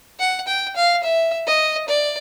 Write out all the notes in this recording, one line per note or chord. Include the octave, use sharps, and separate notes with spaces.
F#5
G5
F5
E5
D#5
D5